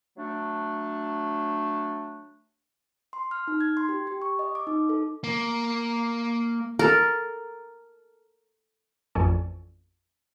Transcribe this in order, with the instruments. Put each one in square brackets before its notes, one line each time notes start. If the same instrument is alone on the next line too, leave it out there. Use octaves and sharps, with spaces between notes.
[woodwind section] F#3 A3 D4
[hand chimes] C6
F6
D#4
G#6
C6
G4
G4
C#6
D#5
D6
D#4
A4
[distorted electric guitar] A#3
[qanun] A4 A#4
[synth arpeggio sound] A1 F2 A4 D5 G#5 C#6